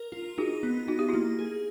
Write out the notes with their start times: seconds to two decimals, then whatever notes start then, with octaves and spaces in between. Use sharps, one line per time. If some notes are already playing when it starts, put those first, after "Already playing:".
Already playing: A#4
0.12 F4
0.38 D#4 F#4 G#4
0.63 B3
0.88 D#4 F#4
0.99 G4
1.09 A#3 E4 F#4
1.39 G#4